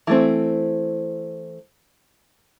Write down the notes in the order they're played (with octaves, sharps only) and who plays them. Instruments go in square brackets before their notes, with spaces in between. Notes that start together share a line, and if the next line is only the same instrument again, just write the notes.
[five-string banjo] E3 A3 C4